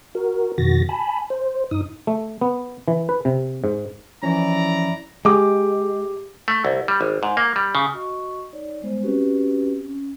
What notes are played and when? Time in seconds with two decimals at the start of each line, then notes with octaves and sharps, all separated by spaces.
0.15 F#4 A#4
0.58 F2 B2 D#3 F#4 A6 A#6
0.89 G#5 A5 B5
1.30 C5
1.71 G2 D#4 D#6
2.07 A3
2.41 B3
2.88 E3
3.09 B4
3.25 C3
3.64 G#2
4.23 E3 F3 C#4 E4 D5 A#5
5.25 G#3 G4 G#4 D6
6.48 A3
6.65 C2
6.88 G3
7.01 G#1
7.23 G#2
7.37 A#3
7.56 G3
7.75 C#3
7.94 F#4 D#5 C#6
8.53 D#4 C#5 D5
8.81 G3 G#3 B3 C5
9.03 C4 C#4 F#4 G4 B4
9.84 C#4